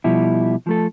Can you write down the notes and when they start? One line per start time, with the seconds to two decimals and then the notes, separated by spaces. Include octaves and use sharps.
0.04 B2 F3 G3 E4
0.67 F3 A3 A4